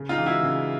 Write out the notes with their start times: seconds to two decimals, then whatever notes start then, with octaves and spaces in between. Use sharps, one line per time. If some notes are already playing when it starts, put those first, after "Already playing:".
Already playing: C#3
0.09 D#4 F4
0.18 E3 G#3
0.26 E4 F#4
0.43 C#3